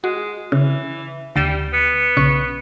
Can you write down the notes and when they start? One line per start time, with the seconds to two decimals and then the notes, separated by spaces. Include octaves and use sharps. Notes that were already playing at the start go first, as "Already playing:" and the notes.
0.04 G#3 F#4
0.52 C#3 E3
1.36 D2 G3 A6 E7
1.73 B3
2.17 B1 C#3 C#6